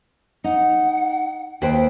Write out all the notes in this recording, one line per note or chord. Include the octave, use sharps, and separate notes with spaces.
D#4 F#5
D#2 B4 C5 G5